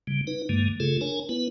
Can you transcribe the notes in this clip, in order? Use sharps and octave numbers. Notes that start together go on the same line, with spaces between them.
C#3 G3
D#4 B4
G2 D3 G#3 A#3
C#3 A3 F4 G#4 A4
D4 A#4 C#5 G#5
B3 E4 B4